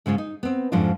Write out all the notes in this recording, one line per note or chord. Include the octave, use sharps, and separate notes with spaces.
G#2 C#3 G#3 F4
D#4
B3 C4
F2 G#2 F3 C#4 D4 F4